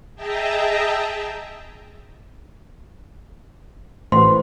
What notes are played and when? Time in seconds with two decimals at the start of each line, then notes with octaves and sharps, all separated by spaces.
0.15 G#4 D#5 E5 G5 A5 A#5
4.12 A1 E3 A3 F#4 B4 C5 C6